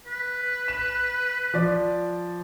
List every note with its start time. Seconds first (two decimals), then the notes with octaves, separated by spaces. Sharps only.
0.07 B4
0.68 E7
1.54 F3 D5